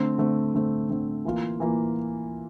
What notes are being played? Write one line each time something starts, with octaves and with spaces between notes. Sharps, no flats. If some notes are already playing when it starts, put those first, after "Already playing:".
Already playing: D3 A3 C4
D3 A3 C4
D3 A3 C4
D3 A3 C4
E3 A#3 F4
E3 A#3 F4